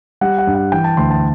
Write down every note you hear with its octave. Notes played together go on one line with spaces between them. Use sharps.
G3 F#5
F#5
G2
F#5
E3 G5
A5
D2 C6
A5